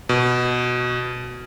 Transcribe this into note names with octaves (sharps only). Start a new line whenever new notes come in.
B2